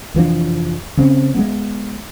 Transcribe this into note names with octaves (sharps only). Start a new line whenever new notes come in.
F1 E3 F3 D4
C#3 C4 C#4
G#3 A#3 B3